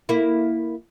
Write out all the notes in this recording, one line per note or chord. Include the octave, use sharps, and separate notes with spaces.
A#3 E4